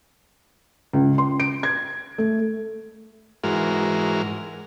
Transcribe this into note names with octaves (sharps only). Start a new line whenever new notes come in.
C#2
C6
D7
G#6
A3
G#2 E3 G#3 F#4 A#4 F6